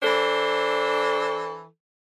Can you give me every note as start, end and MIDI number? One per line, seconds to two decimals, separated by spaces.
0.03 1.64 52
0.03 1.64 62
0.03 1.64 69
0.03 1.64 72